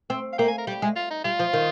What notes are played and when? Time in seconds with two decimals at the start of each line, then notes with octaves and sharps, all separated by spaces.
0.10 C4
0.33 F5
0.38 A#3 G5
0.48 G#5
0.58 A#4
0.67 G3 G4
0.82 G#3
0.96 F4
1.11 D#4
1.24 G3 F4
1.39 F3
1.53 D#3